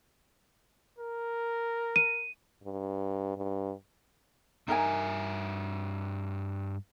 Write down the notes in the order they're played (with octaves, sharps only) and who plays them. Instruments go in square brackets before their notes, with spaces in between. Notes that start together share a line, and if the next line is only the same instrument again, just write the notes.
[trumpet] A#4
[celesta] D#7
[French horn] G2
G2
[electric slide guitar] G2 E5 [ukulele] D#4 A#4 G#5